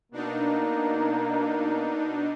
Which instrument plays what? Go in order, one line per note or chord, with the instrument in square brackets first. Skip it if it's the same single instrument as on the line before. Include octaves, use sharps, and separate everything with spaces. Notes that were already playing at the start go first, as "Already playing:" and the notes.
[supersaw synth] B2 D4 D#4 [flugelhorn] A#3